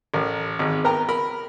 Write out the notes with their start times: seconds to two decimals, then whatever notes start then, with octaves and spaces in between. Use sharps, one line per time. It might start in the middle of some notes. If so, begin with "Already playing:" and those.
0.14 A1 A#4
0.59 G#1
0.84 B3 A#4 G5 A#5
1.09 A#4 B5